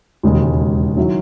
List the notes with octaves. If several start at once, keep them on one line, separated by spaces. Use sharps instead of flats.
E1 D#2 C#3 G#3
D#3 F#3 C#4 E4